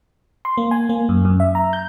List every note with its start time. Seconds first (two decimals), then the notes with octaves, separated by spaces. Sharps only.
0.45 C6
0.57 A#3
0.71 G#5
0.89 A#3
1.09 F#2
1.25 F#2
1.40 E5
1.55 A#5
1.73 G6